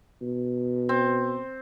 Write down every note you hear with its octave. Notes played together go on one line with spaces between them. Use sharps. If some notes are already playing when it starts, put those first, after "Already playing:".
B2
C4